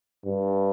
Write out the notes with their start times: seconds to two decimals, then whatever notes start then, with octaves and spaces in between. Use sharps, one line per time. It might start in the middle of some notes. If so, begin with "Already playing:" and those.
0.25 G2